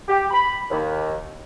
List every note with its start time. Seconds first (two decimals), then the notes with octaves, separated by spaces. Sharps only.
0.08 G4
0.31 B5
0.70 D#2